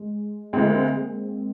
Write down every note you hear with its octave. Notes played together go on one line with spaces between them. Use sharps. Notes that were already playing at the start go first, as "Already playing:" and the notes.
Already playing: G#3
D2 D3 G#3 C4
A#3
C4
A#3
G#3